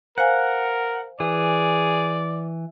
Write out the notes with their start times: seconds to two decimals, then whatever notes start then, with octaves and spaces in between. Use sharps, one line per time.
0.18 A#4 C5 F5 F#5 G#5
1.20 E3 G#4 D5